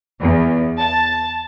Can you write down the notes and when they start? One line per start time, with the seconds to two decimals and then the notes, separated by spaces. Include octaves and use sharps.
0.20 E2
0.81 A5